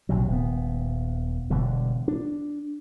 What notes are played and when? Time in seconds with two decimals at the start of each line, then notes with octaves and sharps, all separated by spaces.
0.09 A#1 C3 F#3
0.28 D#1 B3
1.50 E1 B2 D3 G3
2.08 D4